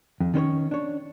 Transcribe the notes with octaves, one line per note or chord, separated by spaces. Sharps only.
F2
D#3 C#4 C5 C#5
D4 C#5